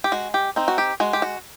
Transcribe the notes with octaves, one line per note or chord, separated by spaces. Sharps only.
G4
G#3 F#4
G4
C4 D#4
F#4
G4
G#3 F#4
G4
F#4